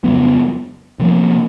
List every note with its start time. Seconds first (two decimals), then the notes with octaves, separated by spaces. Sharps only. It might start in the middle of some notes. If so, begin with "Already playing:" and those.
0.04 F2 C#3 F#3 B3
0.99 C3 F3 A#3